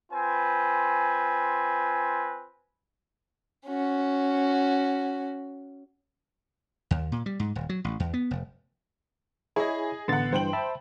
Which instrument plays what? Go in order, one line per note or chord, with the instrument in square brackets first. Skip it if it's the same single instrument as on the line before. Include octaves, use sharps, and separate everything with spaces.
[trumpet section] C4 F4 B4 G#5
[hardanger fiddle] C#4 F#4
[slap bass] D#2
A#2
G3
G#2
D#1
F#3
A1
E2
B3
F1
[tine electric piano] E4 C#5 [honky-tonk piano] G#4 D#5
[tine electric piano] A1 B3 A6 [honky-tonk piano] D3 F#5
[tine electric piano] G2 E3 [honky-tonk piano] C5 G5 F#7
[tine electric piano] E5 A5 B5